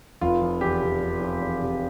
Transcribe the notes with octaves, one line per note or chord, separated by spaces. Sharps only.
F1 F4
F3
E2 G4
C3
F1
F3
E2
C3